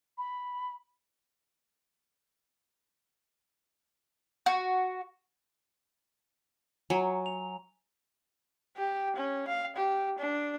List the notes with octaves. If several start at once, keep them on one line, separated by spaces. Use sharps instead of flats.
B5
F#4
F#3 G#5 A#5
F7
G4
C#4
F5
G4
D4